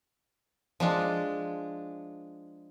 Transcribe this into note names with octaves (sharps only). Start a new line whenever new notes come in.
F3 G#3 D4